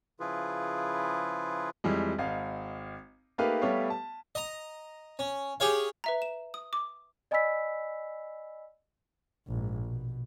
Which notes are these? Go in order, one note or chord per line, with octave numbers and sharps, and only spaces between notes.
C#3 F3 E4 F4 G#4 B4
F2 E3 G3 G#3
G#1 D#5 F5
A3 A#3 D#4 G4 B4 F5
G3 A3 B3 G4 C#5 F5
A5
D#5 A#5
C#4
G4 G#4 C#5 F5
B4 E5 A#5
E7
D#6
D6
D5 D#5 G#5 B5 E6 B6
A#1 G#2
B2